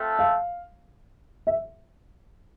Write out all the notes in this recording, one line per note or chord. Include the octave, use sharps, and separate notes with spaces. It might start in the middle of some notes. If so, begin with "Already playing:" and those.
Already playing: A3 C4 F4 A4
F5
E5